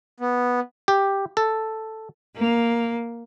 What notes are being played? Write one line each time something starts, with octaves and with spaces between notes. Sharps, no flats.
B3
G4
A4
A#3